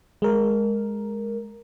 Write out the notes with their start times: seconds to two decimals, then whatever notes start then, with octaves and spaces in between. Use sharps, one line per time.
0.22 G#3 A#4